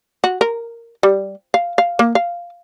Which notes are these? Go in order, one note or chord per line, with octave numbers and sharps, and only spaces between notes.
F#4
A#4
G3
F5
F5
A#3
F5